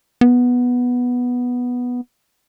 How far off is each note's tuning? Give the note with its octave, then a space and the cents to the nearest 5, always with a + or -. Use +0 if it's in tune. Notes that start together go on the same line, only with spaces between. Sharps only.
B3 -5